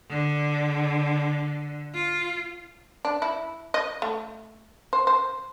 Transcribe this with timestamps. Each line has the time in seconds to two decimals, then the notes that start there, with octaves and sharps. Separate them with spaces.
0.10 D3
1.94 F4
3.05 D4
3.22 E4
3.74 D#5
4.02 A3
4.93 C5
5.07 C5